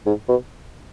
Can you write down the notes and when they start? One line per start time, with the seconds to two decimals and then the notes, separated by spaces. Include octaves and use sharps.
0.06 G#2
0.29 B2